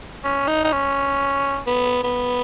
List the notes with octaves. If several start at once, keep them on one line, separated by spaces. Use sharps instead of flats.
C#4
D#4
D#4
C#4
B3
B3